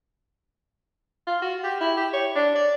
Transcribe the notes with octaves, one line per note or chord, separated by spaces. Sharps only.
F4
F#4
G4
E4
G4
C#5
D4
D5